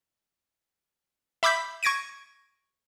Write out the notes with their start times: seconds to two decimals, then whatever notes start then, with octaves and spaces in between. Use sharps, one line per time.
1.43 E5 B5 D6 E6 G6 B6
1.83 C#6 G#6 A#6 D7 D#7